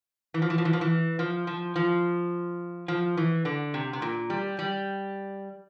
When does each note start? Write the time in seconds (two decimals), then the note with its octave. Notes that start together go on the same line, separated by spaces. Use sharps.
0.34 E3
0.42 F3
0.50 E3
0.58 F3
0.65 E3
0.73 F3
0.81 E3
1.19 F3
1.47 F3
1.76 F3
2.88 F3
3.17 E3
3.45 D3
3.74 C3
3.93 C3
4.02 A#2
4.30 G3
4.59 G3